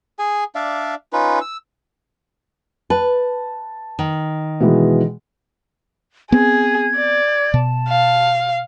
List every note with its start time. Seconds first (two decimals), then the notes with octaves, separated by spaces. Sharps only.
0.19 G#4 G#5
0.55 D4 D5 E5 F5
1.13 C#4 D#4 F4 B4
1.41 E6
2.90 B4 A5
3.99 D#3
4.60 B2 E3 G#3
6.32 B3 C4 G#4 G#6
6.97 D5
7.54 B2 A5
7.89 F5